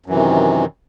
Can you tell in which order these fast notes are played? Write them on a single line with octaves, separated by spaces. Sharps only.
F#2 E3 C3 D#3